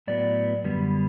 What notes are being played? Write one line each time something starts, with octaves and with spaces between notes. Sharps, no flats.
A2 F#3 B3 D5
F#2 D3 G3 B3